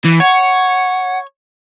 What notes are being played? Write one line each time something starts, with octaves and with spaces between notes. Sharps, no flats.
E3
C#5 F#5